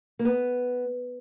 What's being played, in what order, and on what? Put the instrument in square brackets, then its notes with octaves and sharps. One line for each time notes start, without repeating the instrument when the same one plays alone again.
[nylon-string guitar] A#3
B3